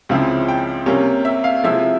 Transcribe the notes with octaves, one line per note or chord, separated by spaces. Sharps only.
C#2 C#3 F3 C4 E4
G5
C3 G3 A#3 C#4
E5
F5
C3 F3 G#3 E4 E5